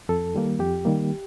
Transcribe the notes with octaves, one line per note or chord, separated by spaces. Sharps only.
F2 A4
D#3 G3 A#3
F2 G4
D#3 G3 A#3